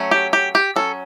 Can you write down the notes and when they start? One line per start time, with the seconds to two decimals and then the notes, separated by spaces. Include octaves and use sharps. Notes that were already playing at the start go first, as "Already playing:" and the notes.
Already playing: F#3 A3 C#4
0.11 G4
0.33 G4
0.55 G4
0.76 F#3 C#4 A4